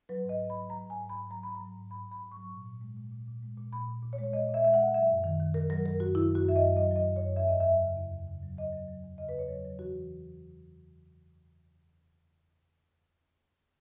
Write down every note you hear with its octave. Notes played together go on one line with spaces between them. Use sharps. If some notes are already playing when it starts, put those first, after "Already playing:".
F#3 B4
G#2
D#5
F#3
B5
F#3
F#3 A#5
G#2
G#5
G#2
B5
G#2
F#3 A#5
G#2 B5
A#5
F#3
G#2
G#2 B5
G#2
B5
G#2
C#6
F#3
A#2
A#2
G#3
A#2
A#2
A#2
G#3
A#2
A#2 B5
A#2
A#2
C#5
G#3
C#5
A#2 D#5
A#2 E5
G#3 E5
F#5
G#3
F#3 E5
F#2
D#3
D#3
D#3 A#4
F#3 A#4
F#2 A#4
F#2 F#4
D#3 E4
F#2 F#4
F#2 E5
D#5
F#3
F#3 D#5
F#3 D#5
F#2
C#5
F#2
E2 E5
E2 D#5
E5
F#3
C#3
E2
E2
C#3
F#3
F#3 D#5
F#3
F#3
E2
C#3 D#5
B4
E2
C#5
F#3
C#5
F#3
E3 F#4